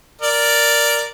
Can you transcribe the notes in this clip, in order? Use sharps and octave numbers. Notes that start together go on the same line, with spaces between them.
A#4 D5